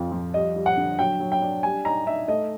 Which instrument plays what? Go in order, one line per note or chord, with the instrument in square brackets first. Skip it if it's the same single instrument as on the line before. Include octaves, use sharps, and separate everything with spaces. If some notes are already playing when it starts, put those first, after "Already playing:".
Already playing: [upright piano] F2 F3
F3
G3 D#5
G3
F#5
D3
F#3 G5
F#3
G5
D4
G3 G#5
D#4 A#5
D#4 E5
A3 D#5